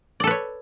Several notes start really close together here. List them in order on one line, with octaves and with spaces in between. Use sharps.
D5 A4 B4 C#5